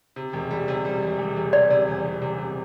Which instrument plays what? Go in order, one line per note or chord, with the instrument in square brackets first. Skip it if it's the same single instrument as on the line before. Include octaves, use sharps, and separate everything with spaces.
[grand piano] C3
E1
G3
C3
G3
E1
E1
C3
[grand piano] G3 [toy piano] D5
[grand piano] C3
E2
C3
C3
C3